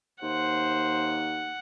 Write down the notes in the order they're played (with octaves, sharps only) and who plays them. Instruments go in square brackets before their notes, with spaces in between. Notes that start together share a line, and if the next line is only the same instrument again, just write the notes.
[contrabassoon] D#2 [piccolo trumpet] C5 [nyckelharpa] F#5